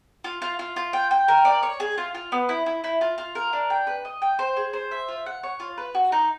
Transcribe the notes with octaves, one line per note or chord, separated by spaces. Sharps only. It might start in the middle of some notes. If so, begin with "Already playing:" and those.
F4
F4
F4
F4
G5
G5
A#4
D5
C#5
G#4
F4
F4
B3
E4
E4
E4
F4
F4
A#4
D4
G5
B4
D#5
G5
C5
G#4
C5
E5
F4
F#5
C#5
F4
B4
F#4
D#4